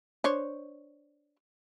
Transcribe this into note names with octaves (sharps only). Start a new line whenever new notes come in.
D4 C5 C#5